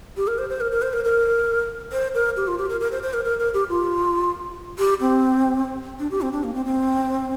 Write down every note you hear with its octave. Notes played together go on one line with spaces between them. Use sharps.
G4
A#4
C5
C5
A#4
A#4
C5
A#4
A#4
C5
A#4
G4
F4
G4
A#4
A#4
C5
C5
A#4
A#4
A#4
G4
F4
G4
C4
D4
G4
C4
D4
A#3
C4
C4